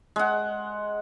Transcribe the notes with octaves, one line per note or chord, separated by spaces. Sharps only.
G#3 F#5